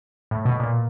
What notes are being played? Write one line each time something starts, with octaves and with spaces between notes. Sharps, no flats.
A2
B2
A#2